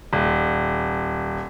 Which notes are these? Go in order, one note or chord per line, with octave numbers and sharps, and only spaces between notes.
D#1